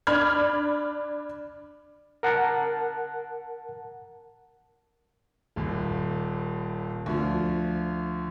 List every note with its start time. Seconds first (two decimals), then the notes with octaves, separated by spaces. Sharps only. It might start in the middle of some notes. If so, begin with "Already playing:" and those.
0.07 D4 B5 F6 G#6
2.23 A#4 F#5 A5 F#6
5.56 D#1 D#2
7.06 D2 F3